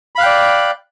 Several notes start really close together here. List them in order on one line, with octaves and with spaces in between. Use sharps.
B5 F5 F#6 G5 D5